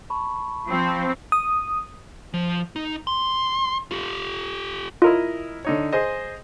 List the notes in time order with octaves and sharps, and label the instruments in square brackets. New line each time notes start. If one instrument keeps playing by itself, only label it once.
[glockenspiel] A5 B5 C#6
[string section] F3 C4
[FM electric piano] D#6
[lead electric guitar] F3
D#4
C6
F4 G4
[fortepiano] E4 A#4 D#5 [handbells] F4
[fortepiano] D3 D#4 C#5
G#4 C5 D#5